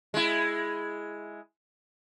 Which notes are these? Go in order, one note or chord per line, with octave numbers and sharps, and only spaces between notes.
G#3 E4